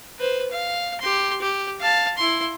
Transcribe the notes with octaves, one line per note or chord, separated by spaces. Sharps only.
B4 C5
F5
G4 C6
G4
F5 A5
E4 C6